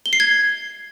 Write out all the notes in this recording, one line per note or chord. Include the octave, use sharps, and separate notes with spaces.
G7
C7
G#6